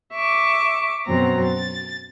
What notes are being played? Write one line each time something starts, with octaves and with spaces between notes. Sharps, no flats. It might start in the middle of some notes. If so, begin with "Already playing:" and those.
E5 C#6 D6
F#2 B2 F#3 C4 A#5
A6